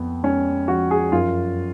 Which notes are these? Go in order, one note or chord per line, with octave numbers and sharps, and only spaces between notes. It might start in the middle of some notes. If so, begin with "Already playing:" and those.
Already playing: F2 B3
G#3 C#4
F3 F#4
G#4
F#2 F4